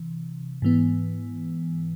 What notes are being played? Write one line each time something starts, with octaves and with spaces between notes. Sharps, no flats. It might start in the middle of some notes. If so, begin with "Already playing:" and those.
Already playing: C3 E3
G#2 E3 B3